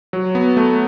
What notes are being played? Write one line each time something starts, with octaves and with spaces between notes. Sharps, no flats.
F#3
B3
A3